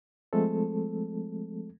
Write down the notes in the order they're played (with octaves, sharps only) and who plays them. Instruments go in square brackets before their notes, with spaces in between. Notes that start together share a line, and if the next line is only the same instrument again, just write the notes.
[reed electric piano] F3 G#3 A3 C4 A4